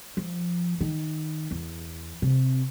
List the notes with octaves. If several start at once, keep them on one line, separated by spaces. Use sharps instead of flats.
F3
D#3
E2
C3